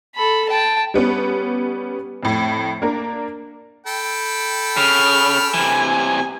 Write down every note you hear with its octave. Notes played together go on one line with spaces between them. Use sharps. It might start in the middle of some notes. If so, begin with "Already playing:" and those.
A4 B5
G5 A5
G3 B3 C#4
F2 A2
A#3 D4 A#4
A4 G5 B5
C#3 F6
C3 E3 G#5